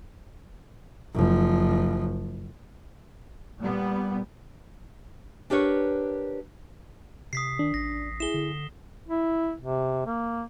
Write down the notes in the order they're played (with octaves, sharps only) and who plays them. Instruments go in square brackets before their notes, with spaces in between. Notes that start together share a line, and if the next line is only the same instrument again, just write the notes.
[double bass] F#1 F3
[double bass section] A#2 G3 B3
[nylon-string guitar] D4 G4 A#4 B4 C#5
[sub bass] C3 [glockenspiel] D#6 B6 C7
[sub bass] D#3 [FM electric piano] D4
[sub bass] A1 [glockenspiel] A#6
[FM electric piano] E4 G#4 [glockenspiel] E7 G7
[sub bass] D3
[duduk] E4
C3
A#3